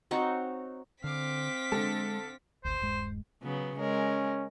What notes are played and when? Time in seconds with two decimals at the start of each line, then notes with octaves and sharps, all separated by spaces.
0.11 C4 D#4 F#4 C#5
1.04 D3 C4 F5 D6 B6
1.72 D3 G#3 A4
2.65 G#1 D2 C5
2.79 D#1 G2 G#3
3.43 C#3 F#3 B3
3.79 G#3 C#4 A#4